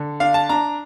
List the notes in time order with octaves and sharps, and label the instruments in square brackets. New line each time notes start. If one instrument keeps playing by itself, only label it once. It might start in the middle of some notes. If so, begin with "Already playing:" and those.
Already playing: [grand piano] D3
D4 F5
A5
D4 A#5